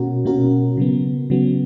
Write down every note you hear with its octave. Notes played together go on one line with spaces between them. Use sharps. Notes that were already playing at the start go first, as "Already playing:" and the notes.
Already playing: B2 A#3 C#4 F#4 A#4
B2 A#3 C#4 F#4 A#4
C#3 F#3 B3
C#3 F#3 B3